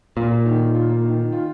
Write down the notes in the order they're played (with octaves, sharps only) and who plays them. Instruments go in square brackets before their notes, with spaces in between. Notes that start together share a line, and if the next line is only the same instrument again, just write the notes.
[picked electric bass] A#2 [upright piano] F4
[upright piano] A#3
D#3
D#3
F4
A#3
D#3
D#3
F4